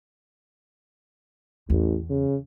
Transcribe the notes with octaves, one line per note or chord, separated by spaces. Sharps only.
A1 E2
C#3